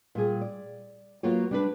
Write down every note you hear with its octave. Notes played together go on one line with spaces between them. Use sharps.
A#2 G3 G#4
D5
F#3 A#3 B3 F4 F#4 C#5
G3 D4 B4